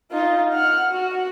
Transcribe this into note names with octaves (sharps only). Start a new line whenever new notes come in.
D#4 F4
F#5 F6
F#4